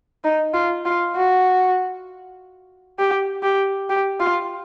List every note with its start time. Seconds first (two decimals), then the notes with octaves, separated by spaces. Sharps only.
0.24 D#4
0.54 F4
0.86 F4
1.16 F#4
2.98 G4
3.43 G4
3.90 G4
4.20 F4